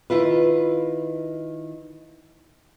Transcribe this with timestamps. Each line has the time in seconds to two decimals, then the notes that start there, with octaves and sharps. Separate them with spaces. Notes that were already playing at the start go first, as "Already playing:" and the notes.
0.10 D#3 E4 F4 B4